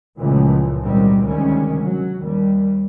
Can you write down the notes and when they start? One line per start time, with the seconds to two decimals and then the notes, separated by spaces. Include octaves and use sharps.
0.17 C#2 A#2 E3 F3 A3
0.81 G#1 A#2 D#3 F#3 G3 C4
1.24 D2 C3 D#3 G3 G#3 C#4
1.82 F#3
2.21 D#2 G3